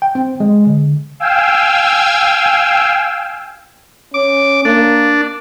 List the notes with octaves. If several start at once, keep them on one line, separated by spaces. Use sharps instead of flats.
G5
C4
G#3
D3
F5 G5 G#5 E6
C#4 D6
A#3 D4